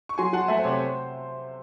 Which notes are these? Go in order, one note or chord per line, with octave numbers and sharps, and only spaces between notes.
C#6
F#3 G#5 C6
F#3 F#5 A5
A3 E5 G#5
C5
C3 C#5
C5